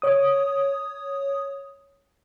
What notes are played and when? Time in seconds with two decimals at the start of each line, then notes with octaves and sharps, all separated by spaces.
0.02 C#5 D#6